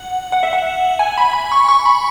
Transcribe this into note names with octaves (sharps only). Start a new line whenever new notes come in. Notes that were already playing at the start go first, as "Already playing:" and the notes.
Already playing: F#5
F#5
E5
F#5
G#5
B5
B5
C#6
C#6
B5